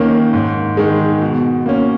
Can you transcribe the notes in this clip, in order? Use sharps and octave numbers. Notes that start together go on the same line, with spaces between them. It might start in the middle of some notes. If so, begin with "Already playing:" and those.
Already playing: D#2 D#3 A#3 C#4
G#2
D#3 G#3
B2
A#3 C#4